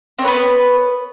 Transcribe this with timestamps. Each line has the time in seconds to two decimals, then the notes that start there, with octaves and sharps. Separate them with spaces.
0.19 C4
0.22 C#5
0.25 B4
0.28 B3